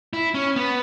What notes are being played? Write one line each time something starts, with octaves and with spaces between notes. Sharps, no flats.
E4
C#4
B3